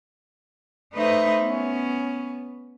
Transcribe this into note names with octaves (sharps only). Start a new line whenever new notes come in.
A3 D#4 B4 C5 D#5 E5
B3 C#4